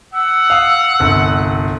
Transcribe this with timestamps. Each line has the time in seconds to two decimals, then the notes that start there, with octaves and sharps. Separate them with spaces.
0.14 F#5 E6
0.50 F5 D#6
1.00 G1 C2